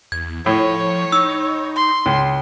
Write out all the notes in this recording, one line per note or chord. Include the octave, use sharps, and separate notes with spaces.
E2 G#6
A2 F3 C#5
D#4 E6
C6
C#2